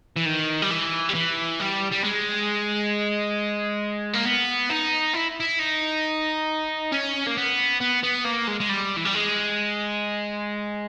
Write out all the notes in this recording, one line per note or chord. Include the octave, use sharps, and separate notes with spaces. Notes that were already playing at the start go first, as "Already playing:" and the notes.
E3
D#3
G3
E3
G3
E3
G3
G3
G#3
A#3
B3
D#4
E4
E4
D#4
C#4
A#3
B3
B3
B3
A#3
G#3
G#3
G3
E3
G3
G#3